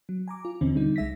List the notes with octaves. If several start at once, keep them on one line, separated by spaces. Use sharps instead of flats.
F#3
G#5 A#5 D6
F4
D#2 B2 D3 E3 C4 C#4
D3 G3 D#4
C2 G#3 E5 A#6 B6